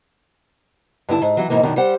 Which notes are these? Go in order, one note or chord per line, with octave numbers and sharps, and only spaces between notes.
G2 D3 E4 A5
G#2
E3 F#3
G#2 B2 E3 A#3
F#2 B2 D#3 D4
G3 C5 F#5